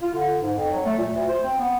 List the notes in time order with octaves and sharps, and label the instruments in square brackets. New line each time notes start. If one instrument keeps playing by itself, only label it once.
[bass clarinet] F4
D3
G#2
F2
F#3
A3
A#2
D2
C5
C4
B3